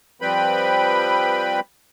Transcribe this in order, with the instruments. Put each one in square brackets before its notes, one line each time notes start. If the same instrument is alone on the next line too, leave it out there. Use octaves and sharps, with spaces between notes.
[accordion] F3 G3 C4 B4 G5 B5